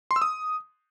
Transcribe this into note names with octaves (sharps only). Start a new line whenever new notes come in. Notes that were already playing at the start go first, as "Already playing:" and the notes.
C6
E6
D#6